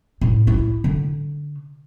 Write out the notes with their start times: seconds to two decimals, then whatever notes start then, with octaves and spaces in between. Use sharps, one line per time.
0.21 A2
0.47 E4
0.84 D3